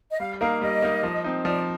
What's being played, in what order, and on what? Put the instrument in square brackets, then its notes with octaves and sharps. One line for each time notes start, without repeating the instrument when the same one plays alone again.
[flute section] D#5
[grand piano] G3 [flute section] F5
[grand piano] A#3 D#4 A#4 [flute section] F5
[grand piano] G3 [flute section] D#5
[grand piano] A#3 D#4 A#4
F3
C4 D#4
[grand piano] F3 [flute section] D5